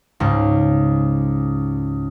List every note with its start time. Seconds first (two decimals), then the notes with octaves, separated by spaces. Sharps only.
0.20 C#2 G#2